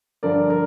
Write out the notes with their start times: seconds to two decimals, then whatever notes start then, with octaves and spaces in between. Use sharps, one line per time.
0.23 G2 D3 F3 A#4 D5
0.50 A#4 D5